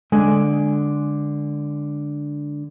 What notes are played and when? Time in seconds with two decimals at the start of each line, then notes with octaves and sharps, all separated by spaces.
0.12 D3 G#3 G#5